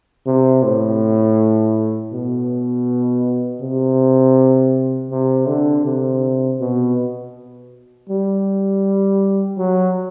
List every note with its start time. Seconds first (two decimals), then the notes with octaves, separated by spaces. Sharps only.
0.27 C3
0.63 A2
2.13 B2
3.61 C3
5.11 C3
5.48 D3
5.86 C3
6.61 B2
8.09 G3
9.58 F#3